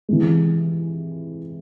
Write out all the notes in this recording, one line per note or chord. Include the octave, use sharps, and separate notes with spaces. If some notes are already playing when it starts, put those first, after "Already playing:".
C3 E3 G#3